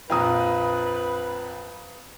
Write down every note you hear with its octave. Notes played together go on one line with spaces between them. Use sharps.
A#1 F2 F4 B4 G5 A#5 D#6